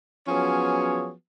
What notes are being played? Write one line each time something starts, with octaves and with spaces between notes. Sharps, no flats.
F3 F#3 B3 C#4 G#4 C#5